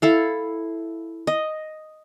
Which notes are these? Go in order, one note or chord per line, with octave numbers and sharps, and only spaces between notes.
E4 A4 F5
D#5